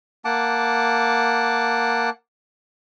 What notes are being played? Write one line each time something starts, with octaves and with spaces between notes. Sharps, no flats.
A#3 F#5 A5 D6